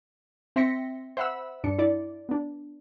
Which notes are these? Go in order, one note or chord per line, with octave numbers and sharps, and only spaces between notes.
C4 E5 C6 A#6 B6 C#7
C5 E5 F#5 B5 E6
G2 D4 C#7
E4 D5
B3 D4